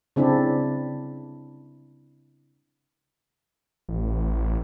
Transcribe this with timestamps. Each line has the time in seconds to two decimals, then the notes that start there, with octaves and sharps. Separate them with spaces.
0.16 C#3 C4 D4 E4
3.89 A1